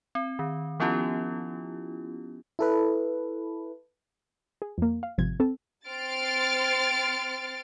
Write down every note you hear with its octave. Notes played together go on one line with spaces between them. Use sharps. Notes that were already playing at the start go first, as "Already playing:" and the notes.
C4
D#3
F3 B3 C#4 E4 F4 G4
E4 A4 B4
G#4
F2 A#3
F5
G#1 C3 F3 G#6
C4 A4
C4 C6 F6 A6 D7